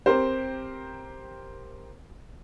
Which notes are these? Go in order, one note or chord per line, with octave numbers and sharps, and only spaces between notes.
C4 G4 A#4 C5